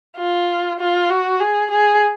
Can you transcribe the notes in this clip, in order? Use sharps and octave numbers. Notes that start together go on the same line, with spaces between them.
F4
F4
F#4
G#4
G#4